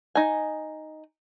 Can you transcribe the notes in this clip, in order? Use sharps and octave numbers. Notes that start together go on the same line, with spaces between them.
D#4 G#5